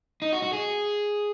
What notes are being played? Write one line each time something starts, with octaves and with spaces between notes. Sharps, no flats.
D#4
F#4
F#4
G#4